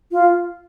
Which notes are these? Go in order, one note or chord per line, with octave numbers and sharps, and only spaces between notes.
F4